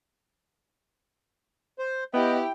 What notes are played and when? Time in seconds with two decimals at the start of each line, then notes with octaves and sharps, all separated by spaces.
1.79 C5
2.14 B3 E4 G4 D#5 G5